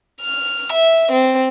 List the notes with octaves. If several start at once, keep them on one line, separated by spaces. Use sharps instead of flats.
F6
E5
C4